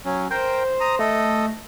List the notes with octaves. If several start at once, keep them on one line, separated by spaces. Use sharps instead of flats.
F#3 C#4
A#4 C5 G5
A#5 D#6
A3 A4 D#5